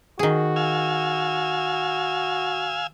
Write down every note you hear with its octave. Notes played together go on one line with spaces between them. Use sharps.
D#3 F#4 G#4
F5 G#5 E6